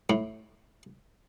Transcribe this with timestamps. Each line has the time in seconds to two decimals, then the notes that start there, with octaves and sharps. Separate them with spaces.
0.10 A2